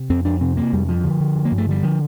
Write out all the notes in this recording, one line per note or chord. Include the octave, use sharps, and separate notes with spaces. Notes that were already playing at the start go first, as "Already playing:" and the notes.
Already playing: C3
F2 C4
F2 D4
C3 C4
C3 A#3
F2 G3
G2 F3
D3
D3
G2
A#3
G2
A3
D3 G3
D3 F3